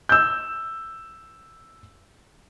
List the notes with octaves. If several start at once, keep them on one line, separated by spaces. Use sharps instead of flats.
E6 G6